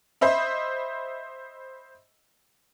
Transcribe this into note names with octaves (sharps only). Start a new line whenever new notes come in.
C5 D#5 E5 B5